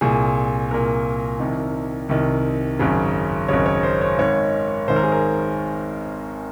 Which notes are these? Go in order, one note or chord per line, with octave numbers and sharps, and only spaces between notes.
C2 A#2 G#4
C2 A#2 A#4
C2 C3 D#3
C2 C3 D#3
G#1 F#2 C#3
G#1 F#2 C#3 C#5
C#5
C5
C#5
G#1 G#2 D#3 C#5
G#1 G#2 D#3 C5
A#4
G#4
A#4